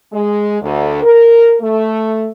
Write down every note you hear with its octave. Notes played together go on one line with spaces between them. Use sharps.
G#3
D2
A#4
A3